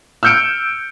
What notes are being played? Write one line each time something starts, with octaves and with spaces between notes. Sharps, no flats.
E6 F6 G6 C#7 D7